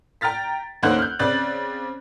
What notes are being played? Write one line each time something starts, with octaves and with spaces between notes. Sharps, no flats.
G5 A#5 F6 A6 B6
D2 A#3 C#4 D#4 C5 F#6
F6 G6
C#3 C4 D5 F#6 A6 F#7